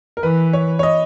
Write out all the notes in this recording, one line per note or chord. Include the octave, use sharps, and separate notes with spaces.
A#4
E3 B4
C#5
C#5
D#5